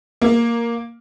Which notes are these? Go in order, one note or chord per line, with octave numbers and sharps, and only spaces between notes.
A#3